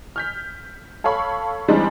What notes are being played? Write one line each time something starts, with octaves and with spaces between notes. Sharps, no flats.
F6 G6 B6
A4 C#5 F5 B5 C#6
E3 G3 G#3 C4 D4 D#4